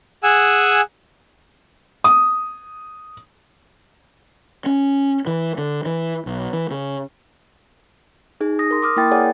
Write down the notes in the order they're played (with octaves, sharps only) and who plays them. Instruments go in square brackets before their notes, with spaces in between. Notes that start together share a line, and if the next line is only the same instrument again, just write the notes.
[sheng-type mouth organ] G#4 F#5 G#5 E6
[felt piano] D#6
[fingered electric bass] C#4
E3
D3
E3
B1
E3
C#3
[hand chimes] D#4 G#4
D#6 A#6
A#4 C6
D6 D#6 F6
A#3 E4 A#4 G5 A6
G#4 C#5 D5 F#5 G#5